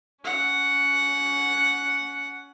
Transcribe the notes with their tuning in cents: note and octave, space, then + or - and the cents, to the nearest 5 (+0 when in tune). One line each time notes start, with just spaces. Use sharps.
C#4 +25 F#5 +0